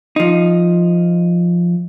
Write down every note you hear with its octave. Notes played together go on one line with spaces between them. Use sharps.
F3 D#4